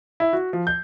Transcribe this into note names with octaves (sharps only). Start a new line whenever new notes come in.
E4
F#4
F3
G6